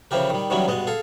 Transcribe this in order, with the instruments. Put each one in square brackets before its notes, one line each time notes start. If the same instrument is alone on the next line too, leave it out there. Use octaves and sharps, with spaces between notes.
[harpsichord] C#3 E3 F3 E4 G4 A#4
D#3 G3
D#3 E3 F#3 G3 C#4 E4
G2 B2 G#3 D#5
G#4 A4 F5